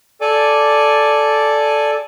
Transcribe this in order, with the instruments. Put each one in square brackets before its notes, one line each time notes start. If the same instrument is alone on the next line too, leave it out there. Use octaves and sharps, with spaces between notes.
[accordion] A4 D5 G#5 D6